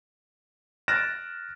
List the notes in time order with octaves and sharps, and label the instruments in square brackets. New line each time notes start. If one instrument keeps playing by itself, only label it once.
[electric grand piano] F6 F#6 A6 A#6 D7 E7